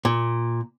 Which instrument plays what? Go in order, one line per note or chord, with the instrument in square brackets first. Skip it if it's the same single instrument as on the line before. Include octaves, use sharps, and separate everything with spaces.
[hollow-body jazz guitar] A#2